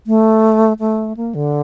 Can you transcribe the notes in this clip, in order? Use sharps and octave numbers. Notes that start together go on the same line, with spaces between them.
A3
A3
A#3
D3